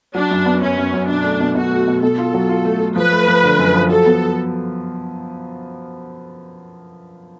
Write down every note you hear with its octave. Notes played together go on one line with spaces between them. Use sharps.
F#3 D4
F#2
B3
F#2 C#4
F#2
F#2
B2 D4
A3
B2
B2 F#4
A3
B2
B2 A4
F4
F#3
F4
A3
A3
F3 B4
A3
F3
D3
F#2
F3
F#3 A4
B3